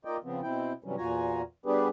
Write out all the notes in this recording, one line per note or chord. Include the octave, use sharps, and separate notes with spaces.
A#3 D#4 F4 D5 D#5 G5
C#3 F3 B3 C4
B2 C4 E4 G5
G2 C3 E3 F#3 G3 C#4
E2 A#2 F4 F#4 G#5 A#5
G3 B3 D4 G4 G#4 B4